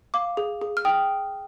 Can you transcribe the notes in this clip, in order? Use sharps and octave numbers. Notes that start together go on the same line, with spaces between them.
F5 D6
G#4
G#4
F6
G5 D#6